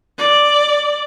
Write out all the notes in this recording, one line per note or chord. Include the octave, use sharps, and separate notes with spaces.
D5